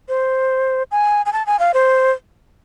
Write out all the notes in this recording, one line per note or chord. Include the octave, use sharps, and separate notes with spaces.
C5
G#5
G#5
A5
G#5
F5
C5